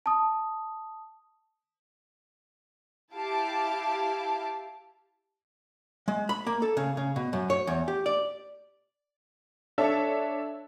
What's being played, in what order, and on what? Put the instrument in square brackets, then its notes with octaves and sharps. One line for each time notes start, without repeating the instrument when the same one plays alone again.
[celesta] A5 D#6
[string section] E4 G4 F5 A5 D6
[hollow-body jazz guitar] G#3
B5
A#3
A4
C#3
C#3
B2
F#2
C#5
E2
G4
D5
[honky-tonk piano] D4 A4 C#5 E5 A5